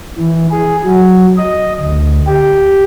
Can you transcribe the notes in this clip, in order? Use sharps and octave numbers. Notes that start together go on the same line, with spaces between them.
E3
G#4
F#3
D#5
D2
G4